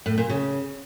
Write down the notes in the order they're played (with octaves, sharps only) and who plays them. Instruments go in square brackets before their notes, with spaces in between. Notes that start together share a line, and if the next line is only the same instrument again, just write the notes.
[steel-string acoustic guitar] A2
A#2
C#3